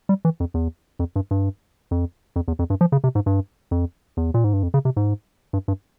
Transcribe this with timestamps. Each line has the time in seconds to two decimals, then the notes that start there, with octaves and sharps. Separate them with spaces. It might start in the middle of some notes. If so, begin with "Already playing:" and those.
0.09 G3
0.25 E3
0.40 F2
0.54 E2
0.99 F2
1.16 G2
1.31 G2
1.91 F2
2.36 F2
2.48 E2
2.59 F2
2.70 G2
2.81 F3
2.92 C#3
3.04 C3
3.15 G#2
3.26 G2
3.71 F2
4.17 E2
4.34 A#2
4.44 G#2
4.53 G2
4.63 F2
4.74 C#3
4.85 C3
4.96 G#2
5.53 G2
5.68 G2